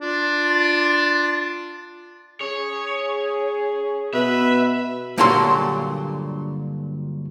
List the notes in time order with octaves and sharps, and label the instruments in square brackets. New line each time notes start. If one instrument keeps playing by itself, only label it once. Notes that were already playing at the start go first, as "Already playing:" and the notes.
[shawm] D4 [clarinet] F4
[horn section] C#4 G#4 [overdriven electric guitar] C#5
[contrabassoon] B2 [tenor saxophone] B4 [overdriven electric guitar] E5
[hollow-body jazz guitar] G2 A#2 D3 F#3 A4 C6